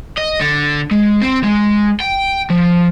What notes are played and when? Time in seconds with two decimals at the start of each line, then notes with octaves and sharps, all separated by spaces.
0.18 D#5
0.41 D3
0.91 G#3
1.22 C4
1.43 G#3
2.00 G5
2.50 F3